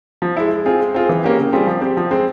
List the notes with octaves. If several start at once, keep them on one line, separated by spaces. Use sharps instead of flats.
F3
G#3 E4
G#3
C4 F4 G#4
G#3
C4 F4 G#4
E3
A#3 C#4 G4
C#3
G3 C4 F4 G#4
F3
C4 G4
F3
G#3 C4